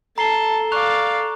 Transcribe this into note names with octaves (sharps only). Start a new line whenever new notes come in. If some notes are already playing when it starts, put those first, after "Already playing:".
A4 A5 A#5 C7 G7
D5 F5 C#6 F#6 F7